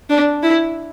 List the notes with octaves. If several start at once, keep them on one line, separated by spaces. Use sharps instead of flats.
D4
E4